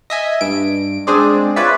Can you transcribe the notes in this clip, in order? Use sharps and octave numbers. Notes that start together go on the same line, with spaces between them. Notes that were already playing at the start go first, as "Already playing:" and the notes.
D#5 E5 G#5
G2 D7
G#3 C4 D4 G#4 C5 D5
F4 B4 C#5 D5 E5